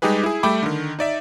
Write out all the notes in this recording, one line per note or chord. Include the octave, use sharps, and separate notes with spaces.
G3 G#3 D#4 G4 G#4 B4
E4 G#4
G3 A3 E5 G5 B5 D6
D3 D#3
D#4 D5 E5